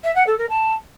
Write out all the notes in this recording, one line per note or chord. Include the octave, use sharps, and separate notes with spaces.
E5
F#5
A4
A#4
A5